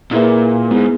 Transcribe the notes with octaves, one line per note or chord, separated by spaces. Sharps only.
A#2 A#3 E4 G#4 B4 E5
G#2 B3 E4 G#4